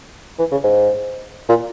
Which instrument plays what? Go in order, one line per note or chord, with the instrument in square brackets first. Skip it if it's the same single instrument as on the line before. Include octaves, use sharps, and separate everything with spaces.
[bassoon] E3
C#3
G#2
A#2